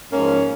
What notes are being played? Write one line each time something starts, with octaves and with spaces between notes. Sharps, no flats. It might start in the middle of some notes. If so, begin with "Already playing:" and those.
G#2 F3 A#3 C#4